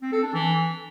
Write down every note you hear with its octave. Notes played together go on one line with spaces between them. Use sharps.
C4
A4
D4
E3